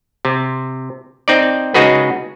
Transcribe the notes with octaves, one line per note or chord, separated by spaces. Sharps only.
C3
C4 D#4 D5
C#3 G#3 D#4 F#4 G#4 B4